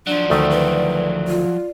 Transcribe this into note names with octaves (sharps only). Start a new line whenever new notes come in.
F3 F#3 D4 D5
D2 D#3 A3 E5
B4
F4